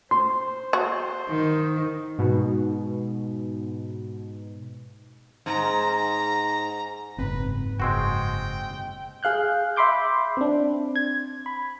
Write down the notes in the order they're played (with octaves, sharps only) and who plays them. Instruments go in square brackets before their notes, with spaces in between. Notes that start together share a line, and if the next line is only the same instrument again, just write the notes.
[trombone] C5 [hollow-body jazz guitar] C6
[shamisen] F#4
[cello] D#3
[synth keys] G#2 B2
[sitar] G#2 [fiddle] A#5
[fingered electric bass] F#1 C4 [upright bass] F2 G#2 [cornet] B4
[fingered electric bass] F#1 [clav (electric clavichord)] G#3 C4 F#4 [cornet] G5
[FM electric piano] G#4 F5 F#6 G6
E5 B5 C6 D6 G6
C4 D4
G#6
B5